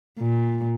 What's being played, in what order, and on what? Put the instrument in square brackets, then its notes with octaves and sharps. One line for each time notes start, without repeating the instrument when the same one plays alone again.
[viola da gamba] A#2